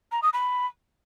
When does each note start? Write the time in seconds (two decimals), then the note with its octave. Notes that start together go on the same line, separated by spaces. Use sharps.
0.12 A#5
0.23 D#6
0.33 B5